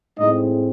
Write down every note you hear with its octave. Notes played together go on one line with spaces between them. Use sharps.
A2 G#3 C4 D#4 D#5